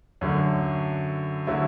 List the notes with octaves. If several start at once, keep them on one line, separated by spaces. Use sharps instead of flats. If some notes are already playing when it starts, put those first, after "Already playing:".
F#2 D3 F#3 A3
D3 F#3 A3 E4